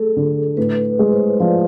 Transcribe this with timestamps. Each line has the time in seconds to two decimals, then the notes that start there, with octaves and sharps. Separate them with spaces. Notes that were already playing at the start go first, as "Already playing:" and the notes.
Already playing: A3 G#4 A4
0.16 D3
0.57 A2 B4
0.85 B4
0.99 G#3
1.13 C5
1.40 F3 D5